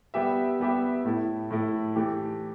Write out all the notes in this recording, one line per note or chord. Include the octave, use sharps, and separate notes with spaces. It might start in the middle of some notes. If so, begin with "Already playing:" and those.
G3 B3 G4 E5
G3 B3 G4 E5
A2 A3 E4
A2 A3 E4
E3 A3 G4